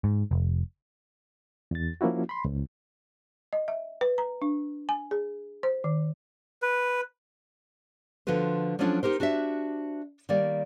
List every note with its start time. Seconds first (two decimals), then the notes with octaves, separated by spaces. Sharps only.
0.04 G#2
0.31 F1
1.71 E2 A6
2.01 F3 A#3 C#4 E4 F#4
2.29 B5 C6
2.45 C#2
3.53 D#5
3.68 E5
4.01 B4
4.18 A#5
4.42 D4
4.89 G#5
5.11 G#4
5.63 C5
5.84 D#3
6.62 B4
8.27 D3 F3 F#4 B4 C5
8.79 F3 F#3 A3 C#4 D4 F4
9.03 D#4 G4 A#4 C5
9.20 D4 F#4 G4 C5 E5
10.29 D#3 G3 A#3 D5